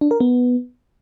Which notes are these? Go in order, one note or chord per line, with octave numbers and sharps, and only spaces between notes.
D4
A#4
B3